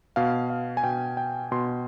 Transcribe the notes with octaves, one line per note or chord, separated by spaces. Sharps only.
B2 F5
F5
G#5
B2 G5
G5
B2 C6